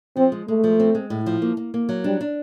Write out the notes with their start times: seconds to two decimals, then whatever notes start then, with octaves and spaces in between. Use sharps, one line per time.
0.16 F3 C4
0.32 G#3
0.48 G#3 A3
0.64 F3
0.80 C4
0.95 G#3
1.10 A2
1.26 F3
1.42 A#3
1.57 A#3
1.74 A#3
1.89 F#3
2.04 G3 D4
2.21 D4